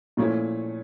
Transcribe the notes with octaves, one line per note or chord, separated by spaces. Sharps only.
A#2 F3 A3 C#4 E4